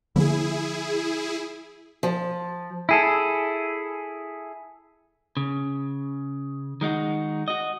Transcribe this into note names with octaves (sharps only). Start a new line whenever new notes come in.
D3 F3 A#3 E4 G#4
F3
E4 G#4 A4
C#3
D#3 G#3 D#4 F#4
F#4 D#5